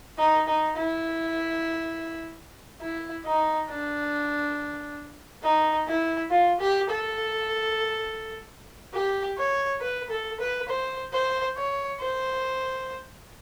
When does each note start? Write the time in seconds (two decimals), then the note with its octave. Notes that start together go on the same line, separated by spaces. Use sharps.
0.18 D#4
0.47 D#4
0.77 E4
2.81 E4
3.25 D#4
3.69 D4
5.44 D#4
5.87 E4
6.31 F4
6.60 G4
6.89 A4
8.94 G4
9.38 C#5
9.81 B4
10.10 A4
10.40 B4
10.69 C5
11.13 C5
11.57 C#5
12.01 C5